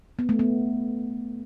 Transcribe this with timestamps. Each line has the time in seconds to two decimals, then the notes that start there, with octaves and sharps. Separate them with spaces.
0.19 B3
0.29 A3
0.39 B3